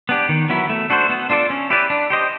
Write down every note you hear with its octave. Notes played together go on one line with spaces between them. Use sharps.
B3 D4 G4
D#3
F#3 B3 E4
A3
D4 F#4 A4 C5
B3
D4 F4 A4 D5
C#4
E4 G4 B4 D5
D4
G4 C5 D#5